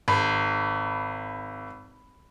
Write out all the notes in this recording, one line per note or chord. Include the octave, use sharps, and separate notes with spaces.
G#1 B5